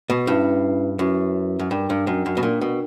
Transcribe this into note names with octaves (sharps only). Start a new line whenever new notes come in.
B2
G2 C#4 E4 B4 E5
F#2 C#4 E4 B4 E5
F#2
G2 D4 A#4 D5 G5
G2
F#2
F#2
B2
A#2 D4 A#4 D5 G5
B2